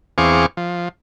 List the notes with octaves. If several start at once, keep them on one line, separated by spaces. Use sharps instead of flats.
E2 C4 G#4 F5 C#6 D6
F3